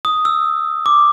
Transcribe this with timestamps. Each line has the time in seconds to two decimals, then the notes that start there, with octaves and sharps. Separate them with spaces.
0.05 D#6
0.25 E6
0.86 D6